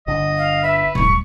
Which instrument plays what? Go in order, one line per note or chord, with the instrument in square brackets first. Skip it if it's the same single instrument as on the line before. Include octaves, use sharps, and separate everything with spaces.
[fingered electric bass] G1 D3 [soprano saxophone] D#5
[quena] F5
[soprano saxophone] B4 [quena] E5
[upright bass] D1 G2 [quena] C#6